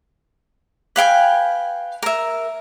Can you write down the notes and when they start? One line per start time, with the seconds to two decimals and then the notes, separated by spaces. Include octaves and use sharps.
0.96 B4 F5 G5 G#5
2.03 A#4 E5